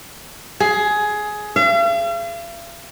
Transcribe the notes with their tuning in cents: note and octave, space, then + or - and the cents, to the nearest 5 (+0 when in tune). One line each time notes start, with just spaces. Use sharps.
G#4 +15
F5 -45